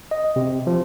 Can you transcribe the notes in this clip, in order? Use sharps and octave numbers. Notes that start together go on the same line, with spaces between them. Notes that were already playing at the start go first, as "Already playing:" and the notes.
D#5
C3
F3